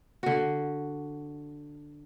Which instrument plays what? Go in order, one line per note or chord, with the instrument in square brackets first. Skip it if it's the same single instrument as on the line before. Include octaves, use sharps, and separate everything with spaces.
[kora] D3 F#4